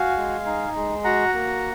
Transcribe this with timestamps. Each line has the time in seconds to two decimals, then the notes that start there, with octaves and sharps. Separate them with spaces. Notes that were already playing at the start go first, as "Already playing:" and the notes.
Already playing: F#4 F5 G#5
0.17 G#3
0.46 D#4
0.75 G#3
1.04 F#4 F#5 A#5
1.34 A#3